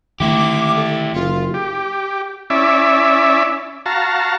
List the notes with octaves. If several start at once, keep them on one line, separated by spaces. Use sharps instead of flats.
D3 D#3 A3 E4 G4 D6
A4
F#1 F4
G4
C#4 E4 D5 E5
F#4 F5 A5 A#5